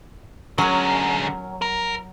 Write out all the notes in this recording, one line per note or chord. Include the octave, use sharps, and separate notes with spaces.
D3 F#3 C#4 G#4 A#4
A#4